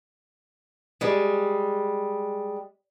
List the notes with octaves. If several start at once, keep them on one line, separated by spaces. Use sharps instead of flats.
G3 G#3